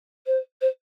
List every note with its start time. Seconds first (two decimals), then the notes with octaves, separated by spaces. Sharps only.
0.26 C5
0.61 C5